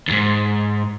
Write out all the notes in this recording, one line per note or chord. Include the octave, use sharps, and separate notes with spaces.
D#2 G#2